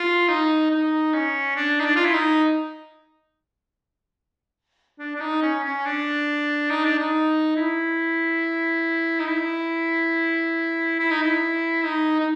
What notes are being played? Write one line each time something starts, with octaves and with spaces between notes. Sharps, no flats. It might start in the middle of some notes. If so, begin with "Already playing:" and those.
Already playing: F4
D#4
D#4
C#4
D4
D#4
D4
F4
E4
D#4
D4
D4
D#4
C#4
C#4
D4
D#4
D4
D#4
E4
D#4
E4
E4
D#4
E4
D#4
D#4